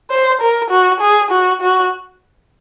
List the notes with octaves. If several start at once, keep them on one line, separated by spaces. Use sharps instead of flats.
C5
A#4
F#4
G#4
F#4
F#4